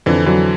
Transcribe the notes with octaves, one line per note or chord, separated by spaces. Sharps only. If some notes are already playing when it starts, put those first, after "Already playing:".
F2 D3 E3
D3 E3 F#3